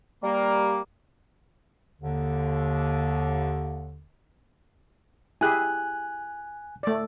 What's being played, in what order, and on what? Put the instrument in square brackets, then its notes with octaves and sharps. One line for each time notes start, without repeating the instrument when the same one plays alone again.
[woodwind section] G3 A#3
D#2 D3
[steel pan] E4 G4 G#4 [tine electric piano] G#5 F#6
[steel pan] A3 D5